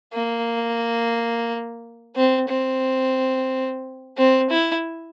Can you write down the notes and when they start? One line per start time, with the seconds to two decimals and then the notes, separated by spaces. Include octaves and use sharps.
0.14 A#3
2.16 C4
2.48 C4
4.17 C4
4.50 E4